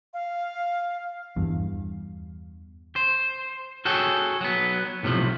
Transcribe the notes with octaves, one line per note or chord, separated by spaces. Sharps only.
F5
E2 G2
C5
F#4 G#4 A4 C#5 G5
F#3 B3
B1 A2 C3 F3